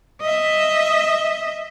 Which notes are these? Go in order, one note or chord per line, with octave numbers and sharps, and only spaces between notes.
D#5 E5